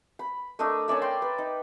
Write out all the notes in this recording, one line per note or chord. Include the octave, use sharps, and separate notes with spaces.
B5
A3 D4 A#4 D#5
C#4 A#4 D5 E5
G5 C6
B4
D#4